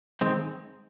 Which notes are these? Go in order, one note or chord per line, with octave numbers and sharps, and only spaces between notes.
D#3 G#3 C4